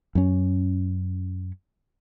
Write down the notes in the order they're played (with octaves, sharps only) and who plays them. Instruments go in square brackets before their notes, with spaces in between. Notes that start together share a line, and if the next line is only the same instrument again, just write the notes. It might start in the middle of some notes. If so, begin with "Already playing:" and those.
[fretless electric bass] F#2 C#4